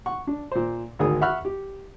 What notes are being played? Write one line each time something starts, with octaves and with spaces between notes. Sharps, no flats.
F#5 C#6
D4
A#2 C5
G#1 D2 G#4 A#4 D#6
E5 F#5 B5 C#6 F6 F#6
G4